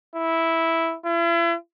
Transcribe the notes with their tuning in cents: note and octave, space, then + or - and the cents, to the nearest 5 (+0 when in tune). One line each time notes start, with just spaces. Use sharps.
E4 -5
E4 +40